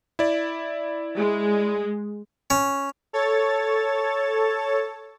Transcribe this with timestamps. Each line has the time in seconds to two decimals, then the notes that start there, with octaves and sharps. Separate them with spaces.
0.19 E4 D5
1.16 G#3
2.50 C#4
3.13 A4 C#5 A6